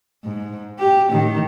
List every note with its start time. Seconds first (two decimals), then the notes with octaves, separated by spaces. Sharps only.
0.24 G#2
0.79 G4
1.10 A2 D#3